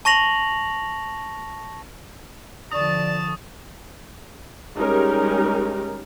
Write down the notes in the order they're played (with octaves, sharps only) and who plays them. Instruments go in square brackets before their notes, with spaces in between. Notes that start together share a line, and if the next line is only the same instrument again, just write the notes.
[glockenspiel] A5 C#6 A#6 F7 F#7
[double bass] D3 F3 [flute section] D5 [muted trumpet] A5 [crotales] C#6 D#6
[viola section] G3 G#3 C#4 D#4 G4 A#4